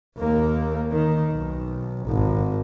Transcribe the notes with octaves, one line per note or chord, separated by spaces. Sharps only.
D#2 A#3
D#3
B1
G#1